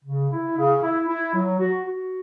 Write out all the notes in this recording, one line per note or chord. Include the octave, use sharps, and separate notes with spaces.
C#3
E4
C#3
E4
E4
F#3
F#4
F#4